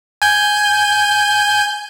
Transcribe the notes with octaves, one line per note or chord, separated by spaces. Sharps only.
G#5 G6